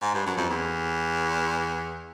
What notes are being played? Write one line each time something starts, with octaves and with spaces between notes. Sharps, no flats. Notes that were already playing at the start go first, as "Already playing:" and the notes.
G#2
G2
F#2
F2
E2